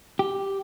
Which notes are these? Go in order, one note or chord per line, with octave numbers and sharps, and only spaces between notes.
G4